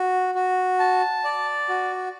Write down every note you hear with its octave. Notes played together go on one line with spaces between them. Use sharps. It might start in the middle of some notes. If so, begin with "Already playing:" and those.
Already playing: F#4
F#4
A5
D5
F#4